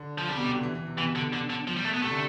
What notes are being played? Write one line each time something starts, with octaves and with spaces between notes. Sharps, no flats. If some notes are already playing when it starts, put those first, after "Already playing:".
Already playing: D3
F3
C3 G3
B2
C3
D3
E3
E3
C3
B2 E3
D3
D3
D3
F3
G3
A3
B3
C3 A3
D3